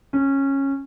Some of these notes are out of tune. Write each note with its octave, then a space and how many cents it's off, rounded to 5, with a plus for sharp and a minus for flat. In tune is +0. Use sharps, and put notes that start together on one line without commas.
C#4 -15